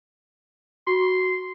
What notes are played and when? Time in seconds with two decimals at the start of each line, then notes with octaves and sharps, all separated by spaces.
0.87 F#4 C6